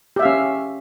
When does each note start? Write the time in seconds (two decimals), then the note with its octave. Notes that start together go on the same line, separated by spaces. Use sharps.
0.16 G4
0.19 E5
0.22 F5
0.25 C#4